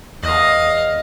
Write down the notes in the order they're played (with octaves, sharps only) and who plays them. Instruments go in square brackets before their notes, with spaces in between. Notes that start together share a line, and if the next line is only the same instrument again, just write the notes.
[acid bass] E2 [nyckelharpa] D#5 F5